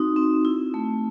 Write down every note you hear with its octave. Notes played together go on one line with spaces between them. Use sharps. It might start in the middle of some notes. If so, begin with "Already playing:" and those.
Already playing: C4 D#4 F#4
C4
E4
A3